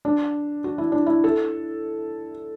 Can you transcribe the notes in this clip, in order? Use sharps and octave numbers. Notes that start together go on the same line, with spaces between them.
D4
F#4
E4
D4
E4
A4